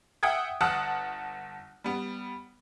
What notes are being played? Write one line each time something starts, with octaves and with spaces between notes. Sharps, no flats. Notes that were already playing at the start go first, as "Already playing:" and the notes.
E5 F#5 G5 D#6 G#6
G1 F#5 A5 D#6 F6 F#6
G3 B3